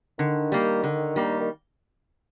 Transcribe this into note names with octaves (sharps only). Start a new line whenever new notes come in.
D3 D#3
G3 A#3
D3
G3 A#3
D#3